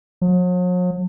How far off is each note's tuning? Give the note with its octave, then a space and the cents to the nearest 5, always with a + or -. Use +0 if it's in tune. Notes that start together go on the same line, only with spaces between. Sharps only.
F#3 -45